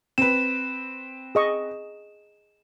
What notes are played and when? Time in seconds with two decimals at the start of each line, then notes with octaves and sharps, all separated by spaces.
0.18 C4 B4 E7
1.35 G#4 D#5 C#6